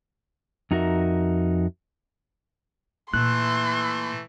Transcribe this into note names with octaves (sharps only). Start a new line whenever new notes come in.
F2 D#4 F#4 A#4 E5
A#2 E3 A3 C6 F#6